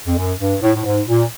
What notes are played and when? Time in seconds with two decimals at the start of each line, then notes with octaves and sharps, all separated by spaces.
0.07 F2
0.16 F#2
0.40 G2
0.62 A2
0.75 A2
0.84 G#2
1.08 A#2